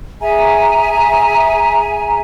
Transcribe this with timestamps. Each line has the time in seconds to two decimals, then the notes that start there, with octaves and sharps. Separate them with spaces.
0.21 G#4 E5 G#5 A#5